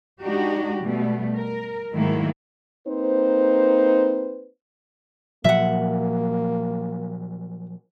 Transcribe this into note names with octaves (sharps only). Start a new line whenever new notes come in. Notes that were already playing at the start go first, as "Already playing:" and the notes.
G#3 D4 D#4 F#4 G4
B2 G3 A3
A#4
G#2 D#3 F#3 A3 A#3 E4
A#3 C4 D#4 B4 C5
A#2 F3 F#3 A#3 E5 F#5